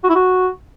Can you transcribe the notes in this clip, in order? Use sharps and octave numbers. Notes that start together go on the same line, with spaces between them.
F#4
E4
F#4